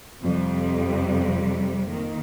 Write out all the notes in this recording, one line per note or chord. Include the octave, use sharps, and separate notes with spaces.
F2 C3 G3
D#3 A#3